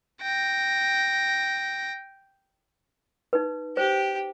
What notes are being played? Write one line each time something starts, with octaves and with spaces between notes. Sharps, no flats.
G5 A#6
D#4 B4
G4 C5